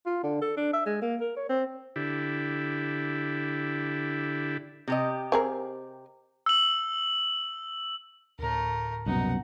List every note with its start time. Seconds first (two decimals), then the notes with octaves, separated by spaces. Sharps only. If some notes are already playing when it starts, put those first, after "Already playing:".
0.06 F4
0.23 D3
0.42 A4
0.57 D4
0.73 E5
0.86 G#3
1.02 A#3
1.21 A#4
1.36 C#5
1.49 C4
1.96 D3 E4 G4
4.88 C3 G4 D#5
5.32 C4 G#4 A#4
6.46 E6 F#7
8.39 D2 A2 A3 A#4
9.06 C2 F#2 B2 D#4 F#5